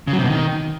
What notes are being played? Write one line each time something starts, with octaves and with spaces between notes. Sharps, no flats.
C#3
F#3
C3
B2
D#3